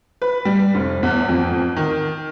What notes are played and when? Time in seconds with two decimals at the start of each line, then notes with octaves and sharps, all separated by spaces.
0.22 B4
0.45 G3
0.75 F1
1.03 E2
1.29 F2
1.76 D#3